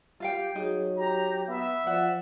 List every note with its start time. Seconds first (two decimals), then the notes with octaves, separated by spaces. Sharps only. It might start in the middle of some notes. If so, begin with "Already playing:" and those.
0.20 F4 G4 F5 G5
0.55 F#3 D#4 G#4
0.97 G4 A#5
1.47 B3 E5
1.87 F3 D5 F#5